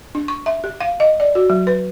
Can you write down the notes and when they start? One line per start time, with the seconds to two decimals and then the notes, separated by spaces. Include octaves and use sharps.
0.15 D4
0.28 C#6
0.46 E5
0.64 G4
0.81 F5
1.00 D#5
1.20 D5
1.35 F#4
1.50 F#3
1.67 B4